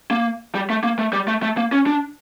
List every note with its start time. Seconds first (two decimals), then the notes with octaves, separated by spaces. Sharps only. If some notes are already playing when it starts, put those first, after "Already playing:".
0.11 A#3
0.55 G3
0.70 A3
0.84 A#3
0.99 A3
1.13 G3
1.28 A3
1.43 A3
1.57 A#3
1.72 C#4
1.86 D4